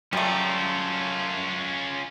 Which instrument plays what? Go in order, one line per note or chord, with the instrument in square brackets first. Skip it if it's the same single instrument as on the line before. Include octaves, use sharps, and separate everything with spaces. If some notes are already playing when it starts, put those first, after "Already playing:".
[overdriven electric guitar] F#2 [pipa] G3 A3 [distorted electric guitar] C#4 F4